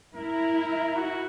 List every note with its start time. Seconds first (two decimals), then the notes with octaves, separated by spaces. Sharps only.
0.15 E4 A#4
0.96 F#4